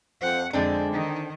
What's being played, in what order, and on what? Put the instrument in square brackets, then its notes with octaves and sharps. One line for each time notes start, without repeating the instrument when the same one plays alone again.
[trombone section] F2 [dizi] C5 [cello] F#5
[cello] F2 [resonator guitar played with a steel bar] D3 C4 D4 [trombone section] G#3 [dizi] D5
[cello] D#3 [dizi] D#4